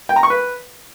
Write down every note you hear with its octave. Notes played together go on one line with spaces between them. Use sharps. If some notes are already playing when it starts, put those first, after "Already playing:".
G5
A#5
C#6
B4